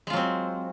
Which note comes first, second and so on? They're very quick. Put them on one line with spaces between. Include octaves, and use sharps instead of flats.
G#3 F4 F#3 C4